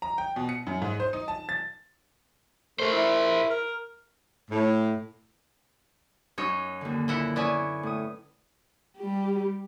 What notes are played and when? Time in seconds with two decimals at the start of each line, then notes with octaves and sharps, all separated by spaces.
0.02 A#5
0.18 G5
0.36 B2
0.49 C#7
0.67 F#2
0.82 G#2
1.00 C5
1.13 D#4
1.28 A5
1.49 A6
2.80 A3 A#4 C5
2.92 E4
3.50 A#4
4.50 A2
6.38 F#2 D#4 C#5 E6
6.81 D#2 D3
7.08 A#2 E4 F#5
7.36 B3 C#4 E4 D5 G#5
7.83 A2 D#6
8.98 G3 G4